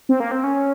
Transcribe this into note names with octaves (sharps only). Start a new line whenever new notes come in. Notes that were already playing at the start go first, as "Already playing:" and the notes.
C4
A#3
C4
C#4